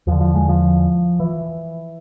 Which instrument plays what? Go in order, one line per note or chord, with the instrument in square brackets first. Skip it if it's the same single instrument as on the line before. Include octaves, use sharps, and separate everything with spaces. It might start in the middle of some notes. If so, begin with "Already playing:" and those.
[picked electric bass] E2 D3 F3
F3
G#3
F3
E3